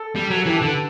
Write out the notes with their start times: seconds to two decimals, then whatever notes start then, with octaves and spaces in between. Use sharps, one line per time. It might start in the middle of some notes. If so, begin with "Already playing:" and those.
Already playing: A4
0.16 G3
0.31 F#3
0.36 A4
0.46 E3 G4
0.57 A4
0.62 D3
0.67 B4